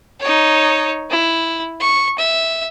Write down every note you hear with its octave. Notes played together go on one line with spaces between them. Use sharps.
D#4 C#5
E4
C#6
E5